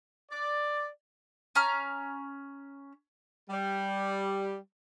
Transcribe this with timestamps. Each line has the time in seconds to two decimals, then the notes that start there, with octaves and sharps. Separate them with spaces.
0.32 D5
1.55 C#4 A#5 F6
3.50 G3